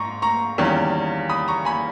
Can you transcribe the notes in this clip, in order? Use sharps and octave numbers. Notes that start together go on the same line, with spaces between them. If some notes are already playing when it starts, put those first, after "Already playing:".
Already playing: G#2 A#5 C#6
A#5 C#6
E2 D#3 G3 A#3 C#4
B5 D#6
A#5 C#6
G#5 B5